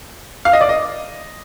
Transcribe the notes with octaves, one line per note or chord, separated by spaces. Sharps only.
F5
D#5
D5
D#5